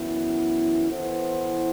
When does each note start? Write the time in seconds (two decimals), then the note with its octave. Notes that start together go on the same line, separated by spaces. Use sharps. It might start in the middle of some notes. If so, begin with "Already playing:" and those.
Already playing: F#2 E3 B3 E4
0.90 E3 B3 E4 A4 C5